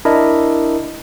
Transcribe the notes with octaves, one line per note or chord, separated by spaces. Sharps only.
D4 E4 A#4 D#5